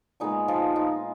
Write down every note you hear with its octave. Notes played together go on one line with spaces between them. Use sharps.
A#2 G#3 B3 D#4
F3 F4
D#4